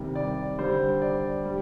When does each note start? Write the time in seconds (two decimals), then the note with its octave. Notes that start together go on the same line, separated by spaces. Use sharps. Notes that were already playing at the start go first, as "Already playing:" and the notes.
Already playing: C3 D#3 G3
0.15 D5
0.59 D3 G3 C5
1.02 D5
1.45 G3